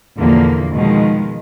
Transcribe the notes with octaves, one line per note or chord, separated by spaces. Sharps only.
E2 A#2 D3 F3 A#3
B2 D#3 F3 G#3